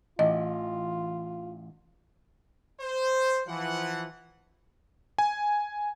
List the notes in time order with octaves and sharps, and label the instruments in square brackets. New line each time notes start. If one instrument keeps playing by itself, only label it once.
[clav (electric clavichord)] A1 [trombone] F4 [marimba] D#5
[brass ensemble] C5
E3 F3 F#5
[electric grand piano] G#5